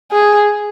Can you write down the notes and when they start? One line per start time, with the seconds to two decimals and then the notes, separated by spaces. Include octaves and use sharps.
0.11 G#4